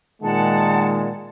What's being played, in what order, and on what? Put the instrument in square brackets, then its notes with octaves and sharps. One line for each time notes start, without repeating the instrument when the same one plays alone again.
[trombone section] A#2 D#3 G#3 [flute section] F#5 A5